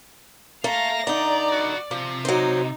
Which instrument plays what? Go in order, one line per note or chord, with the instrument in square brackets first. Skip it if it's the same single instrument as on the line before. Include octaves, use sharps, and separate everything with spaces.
[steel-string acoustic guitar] A3 [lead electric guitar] A#3 A#5 [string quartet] F5 A#6
[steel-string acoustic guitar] D3 D#4 [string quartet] D5 [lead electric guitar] A#5
[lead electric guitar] E4 F#4
[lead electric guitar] C3 [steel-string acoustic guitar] F3
[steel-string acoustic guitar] F#3 C5 [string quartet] D#4